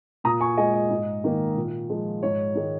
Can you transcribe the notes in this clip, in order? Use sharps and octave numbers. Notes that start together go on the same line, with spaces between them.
A#2 A#5 D#6
G#5 C#6
G#3 D#5 G#5
D#5
G#2
D#3 A#3
A#2
F3 G#3
G#2 C#5
D#3 G#3